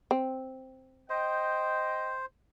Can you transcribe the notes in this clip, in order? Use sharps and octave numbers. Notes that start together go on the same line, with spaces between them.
C4
C5 D#5 G5